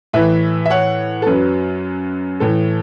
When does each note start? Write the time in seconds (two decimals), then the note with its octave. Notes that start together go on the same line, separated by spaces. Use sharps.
0.13 A2 E3 B4 E5
0.66 E5
0.70 C#5 F#5
1.22 A4
1.26 F#2 F#3 B4
2.40 A2 E3 A4